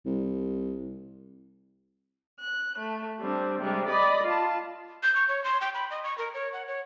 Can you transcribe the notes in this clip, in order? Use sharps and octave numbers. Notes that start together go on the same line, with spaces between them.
C2
F#6
A3
G3 C4 D4
C3 G3 G#3
D5 D#5 B5
F4 A5
G6
C#6
C#5
C6
G5
B5
D#5
C#6
A#4
C#5
F#5
C#5